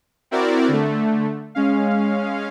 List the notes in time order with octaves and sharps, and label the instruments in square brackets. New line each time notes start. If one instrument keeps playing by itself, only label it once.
[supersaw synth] C4 E4 F#4 A#4 D5
D3 A3
G#3 C#4 F5